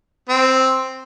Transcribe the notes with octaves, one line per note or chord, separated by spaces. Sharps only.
C4